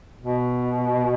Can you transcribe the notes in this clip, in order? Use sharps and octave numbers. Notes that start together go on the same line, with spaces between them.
B2